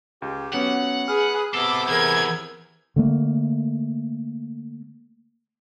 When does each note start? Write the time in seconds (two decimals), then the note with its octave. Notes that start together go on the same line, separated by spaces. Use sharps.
0.22 C#2 G4
0.53 F#3 B3 C#4 F#5
1.08 G#4 B4 F6
1.54 C3 B3 E4 A4 D6 E6 C7
1.88 E3 C4 G#4 A#4 G#6
2.96 D3 A3 A#3